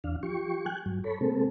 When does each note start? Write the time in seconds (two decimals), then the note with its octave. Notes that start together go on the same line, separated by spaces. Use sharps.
0.04 E2 D4 F5
0.23 F3 G4 C#6
0.66 G5 G#5 F#6
0.86 G2 F#3
1.04 A4 C#5 B5
1.21 C3 G#3 A#3 C4 A4